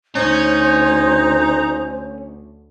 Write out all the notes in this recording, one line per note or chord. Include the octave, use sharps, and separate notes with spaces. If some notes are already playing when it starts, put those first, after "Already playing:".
D2 C#4 D#4 C5